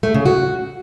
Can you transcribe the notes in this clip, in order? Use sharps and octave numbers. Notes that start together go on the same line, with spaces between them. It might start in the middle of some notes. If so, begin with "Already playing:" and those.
A3
C#3
F#4